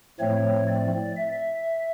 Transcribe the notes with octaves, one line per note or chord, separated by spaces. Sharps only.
A2 F3 A3 C4 C#5
D5
E5